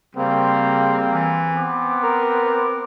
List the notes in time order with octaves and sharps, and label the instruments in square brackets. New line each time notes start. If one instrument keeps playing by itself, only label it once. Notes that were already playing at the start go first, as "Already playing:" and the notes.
[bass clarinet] C#3 [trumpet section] G3 A#3 C4
[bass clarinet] E3
[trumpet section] B3 C4 D6
[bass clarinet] A#4